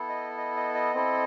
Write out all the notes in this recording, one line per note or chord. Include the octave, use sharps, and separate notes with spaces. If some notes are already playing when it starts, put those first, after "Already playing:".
Already playing: B3 E4 A4
D#5
D#5
D#5
D#5
C4 E4 A4